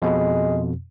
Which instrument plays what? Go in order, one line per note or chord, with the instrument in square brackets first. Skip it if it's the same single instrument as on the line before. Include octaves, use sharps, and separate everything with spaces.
[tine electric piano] F2 B2 [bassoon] G#3